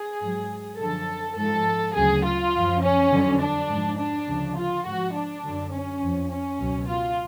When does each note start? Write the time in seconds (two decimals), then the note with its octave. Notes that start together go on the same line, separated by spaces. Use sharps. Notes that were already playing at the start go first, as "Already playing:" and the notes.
Already playing: G#4
0.21 G#2 F#3
0.79 F#2 D3 F3 A4
1.37 G#2 F3 A4
1.95 D2 C#3 F#3 G#4
2.25 F4
2.53 F#2 F3
2.82 C#4
3.11 F2 D3 F#3
3.40 D4
3.69 G#2 F3
3.98 D4
4.27 D2 C#3 F3
4.57 F4
4.85 G#2 F3 F#4
5.14 D4
5.43 F#2 D3 F#3
5.73 C#4
6.01 F2 F3
6.31 C#4
6.59 C#2 B2 F#3
6.88 F4